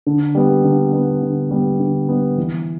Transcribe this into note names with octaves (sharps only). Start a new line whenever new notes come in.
D3
G3 B3
D3
G3 B3
D3
G3 B3
D3
G3 B3
E3